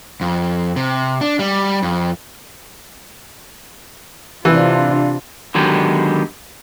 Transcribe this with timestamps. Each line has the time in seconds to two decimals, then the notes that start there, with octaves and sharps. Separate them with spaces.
0.21 F2
0.76 C3
1.21 D4
1.39 G3
1.83 F2
4.45 C3 E3 D4 F4
5.55 D3 D#3 F#3 G#3 B3 G4